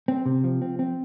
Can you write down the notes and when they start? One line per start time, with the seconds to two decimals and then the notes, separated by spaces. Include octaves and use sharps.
0.08 C4
0.26 C3
0.44 F3
0.62 C4
0.79 C4